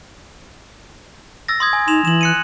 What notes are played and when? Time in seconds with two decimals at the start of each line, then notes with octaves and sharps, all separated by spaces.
1.48 E6 A6 A#6
1.60 C6 D#6 G#6
1.73 G#5
1.88 D#4 C6 E7 F7
2.05 E3 E7 F#7
2.21 F#6 C#7 D#7